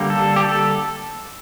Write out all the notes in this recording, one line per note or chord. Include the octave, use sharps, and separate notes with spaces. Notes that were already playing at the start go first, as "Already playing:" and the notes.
Already playing: D3 G3 A#3
A4
G4
A4